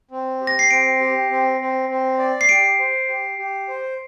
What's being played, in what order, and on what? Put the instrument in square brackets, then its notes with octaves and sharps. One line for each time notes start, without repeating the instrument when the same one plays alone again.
[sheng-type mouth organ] C4
G4
[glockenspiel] A#6
C7
[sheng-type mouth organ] C4 [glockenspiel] D7
[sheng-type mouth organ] G4
C4
C4
C4
D5
[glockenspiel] C7
[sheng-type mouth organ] G4 [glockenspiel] D7
[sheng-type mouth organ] C5
G4
G4
C5